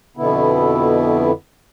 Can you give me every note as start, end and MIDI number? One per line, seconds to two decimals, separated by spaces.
0.17 1.31 41
0.17 1.31 47
0.17 1.31 50
0.17 1.31 59
0.17 1.31 64